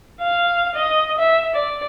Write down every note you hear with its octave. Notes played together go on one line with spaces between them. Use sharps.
F5
D#5
E5
D5